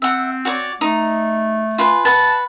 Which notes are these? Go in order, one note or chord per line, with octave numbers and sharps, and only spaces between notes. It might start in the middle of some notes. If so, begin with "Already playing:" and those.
C4 E5 F#5
F#4 C#5 D5
A3 D#4
F4 B4 G#5
B4 F#5 A5